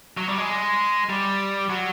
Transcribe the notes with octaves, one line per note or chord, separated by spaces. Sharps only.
F#3
G3
G#3
G3
F#3